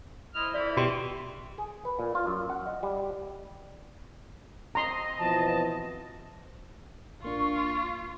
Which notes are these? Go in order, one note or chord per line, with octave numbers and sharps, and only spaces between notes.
E4 C5 D#5 F6
F2 E3 E4 D5 E5
B2 G4 G5 C6
G#4
B4
A#2
F4
F#2
F#5
D#5
G3
C4 D#5 A#5 C6
B2 E3 F3 A5
A1 A#3 D4 F4 C#6